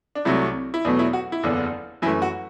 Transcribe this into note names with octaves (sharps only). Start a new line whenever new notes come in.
D4
C2 C3 F#3 A3 E4
E4
E2 B2 F#3 A3 D4
E4
F#4
E4
F#1 E2 D3 D4
F#2 E3 A3 E4
F#4